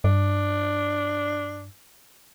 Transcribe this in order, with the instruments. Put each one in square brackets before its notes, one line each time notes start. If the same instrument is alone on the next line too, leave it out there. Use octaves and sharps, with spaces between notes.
[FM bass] G2 [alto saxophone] D4